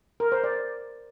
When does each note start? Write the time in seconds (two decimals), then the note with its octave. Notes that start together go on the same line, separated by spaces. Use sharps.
0.20 A#4
0.32 C5
0.44 D5